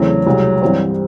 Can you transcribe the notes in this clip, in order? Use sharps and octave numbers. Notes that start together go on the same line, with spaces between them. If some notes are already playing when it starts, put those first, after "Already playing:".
Already playing: E2 C#3 E3 F#3 A3 C4
C2 B2 G#3
G2 E3 G3 C4